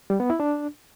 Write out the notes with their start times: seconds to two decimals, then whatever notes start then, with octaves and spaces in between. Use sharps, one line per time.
0.10 G3
0.20 B3
0.30 E4
0.40 D4